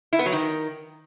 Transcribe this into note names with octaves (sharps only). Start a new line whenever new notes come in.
E4
B3
F#3
D#3